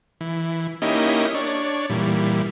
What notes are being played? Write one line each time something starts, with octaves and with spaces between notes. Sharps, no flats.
E3
A#3 C#4 D#4 E4 G4 D#5
D4 C#5
A#2 E3 G3